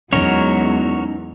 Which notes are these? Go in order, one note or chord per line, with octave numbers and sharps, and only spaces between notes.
E2 F#3 G#3 C#4 D#4 F#4 A#4 C#5